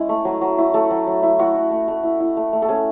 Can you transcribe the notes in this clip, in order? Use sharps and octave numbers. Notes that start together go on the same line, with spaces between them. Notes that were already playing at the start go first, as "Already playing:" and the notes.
Already playing: G#3 C#4 E4
A3
F#3
F#3
E4
A3 A4
F#3
F#3
E4
E4 F#4
E4
A3
A3
E4
E4
A3
A3
A4
C#4 G#4